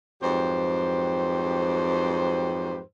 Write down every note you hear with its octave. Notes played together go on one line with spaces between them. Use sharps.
F2 G#2 F#3 G4 B4 C5